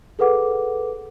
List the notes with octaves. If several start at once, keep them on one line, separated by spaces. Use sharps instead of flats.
G#4 A4 B4 F#5 D6